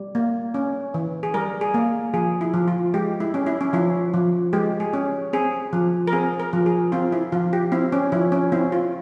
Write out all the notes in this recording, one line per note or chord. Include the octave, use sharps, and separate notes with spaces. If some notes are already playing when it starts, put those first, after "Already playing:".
Already playing: G3
A#3
C#4
E3
G#4
G3 A#4
G#4
A#3
F3 G#4
E4
F3
F4
G#3 G4
E4
C#4
E4
C#4
F3 E4
F3
G#3 G4
G#4
C#4
C4 G#4
F3
A#4
C4 G#4
A#4
F3
G#4
C4 F4
E4
F3 F4
G4
C4 E4
C#4
F3 E4
C#4
C4 E4
F4